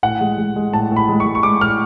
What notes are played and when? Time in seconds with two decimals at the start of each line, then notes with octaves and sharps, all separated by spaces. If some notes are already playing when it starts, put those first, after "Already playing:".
0.03 A2 F#5
0.21 G#3
0.38 G#3
0.56 G#3
0.73 A2 A5
0.91 A2
0.96 B5
1.09 G#3
1.20 C#6
1.26 G#3
1.35 C#6
1.43 G#3 D6
1.61 A2 F6